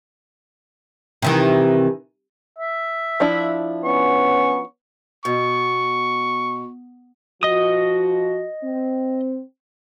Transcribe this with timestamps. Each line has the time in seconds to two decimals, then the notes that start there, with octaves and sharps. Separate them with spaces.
1.22 C3 D#3 E3
2.59 E5
3.20 F3 D4 E4
3.84 B3 C#4 C#6
5.25 B2 C#6
7.43 F3 F#4 D#5 D#6
8.63 C4